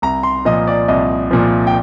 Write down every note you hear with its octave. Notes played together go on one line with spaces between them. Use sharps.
C2 A#5
C6
A#2 F3 D#5
D5
C2 D#5
A#2 F3
G5